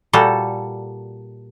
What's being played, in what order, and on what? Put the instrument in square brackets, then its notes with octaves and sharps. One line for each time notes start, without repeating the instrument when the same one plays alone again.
[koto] A#2 G3 F#4 A4